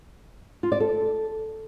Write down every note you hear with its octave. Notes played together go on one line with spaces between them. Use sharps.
F4
D5
A4